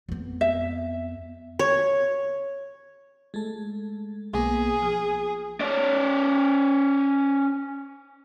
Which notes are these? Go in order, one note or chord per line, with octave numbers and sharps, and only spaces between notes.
F2 B3
E5
C#5
G#3 A3 A4
B1 A#3 B3 G#4
F3
C#4 D5